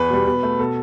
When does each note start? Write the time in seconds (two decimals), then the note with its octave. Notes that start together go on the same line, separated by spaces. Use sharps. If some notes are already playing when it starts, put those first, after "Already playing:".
Already playing: E2 B4
0.10 B2 G3
0.26 B2
0.43 A3
0.59 B2 A4